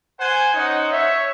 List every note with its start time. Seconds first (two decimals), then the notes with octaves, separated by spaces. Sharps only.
0.19 C5 F#5 G#5
0.54 C#4 D#4 C5 C#5 D#5 F#5
0.92 C#5 E5